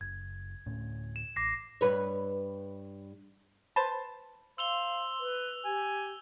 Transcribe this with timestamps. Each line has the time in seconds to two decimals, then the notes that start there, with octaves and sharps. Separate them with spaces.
0.01 F#1 G#6
0.66 D2 A2 C#4
1.16 E7
1.36 A1 D6 A#6 C7
1.81 G2 B4 C#5
3.76 B4 C5 A5
4.58 C5 F5 E6 F7 G7
5.19 B4
5.65 G4 G#5